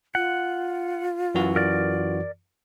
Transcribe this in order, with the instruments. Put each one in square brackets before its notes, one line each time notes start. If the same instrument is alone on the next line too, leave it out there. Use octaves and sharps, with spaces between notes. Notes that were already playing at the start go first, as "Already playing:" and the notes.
[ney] F4 [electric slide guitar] F#5
[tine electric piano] F#2 E3 F#4
[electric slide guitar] A#4 D5